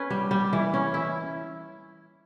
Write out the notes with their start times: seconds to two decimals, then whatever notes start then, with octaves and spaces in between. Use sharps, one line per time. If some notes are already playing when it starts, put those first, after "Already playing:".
Already playing: C#4 B4
0.10 G3
0.31 G3
0.53 E3
0.74 C#4
0.94 E4